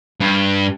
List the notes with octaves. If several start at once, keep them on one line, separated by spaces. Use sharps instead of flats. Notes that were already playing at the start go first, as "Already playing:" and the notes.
G2